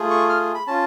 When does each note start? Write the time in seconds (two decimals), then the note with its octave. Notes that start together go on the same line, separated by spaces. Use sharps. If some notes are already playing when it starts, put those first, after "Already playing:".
Already playing: A3 F4 G#4
0.10 C#6
0.30 F6
0.55 B5
0.67 C#4 F4 A5